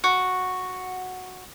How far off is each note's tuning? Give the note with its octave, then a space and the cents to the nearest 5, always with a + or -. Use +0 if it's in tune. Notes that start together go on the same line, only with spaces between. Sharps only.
F#4 -5